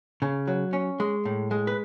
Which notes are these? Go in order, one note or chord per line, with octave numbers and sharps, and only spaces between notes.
C#3
F#3
C#4
G#3
A2
G#3
B4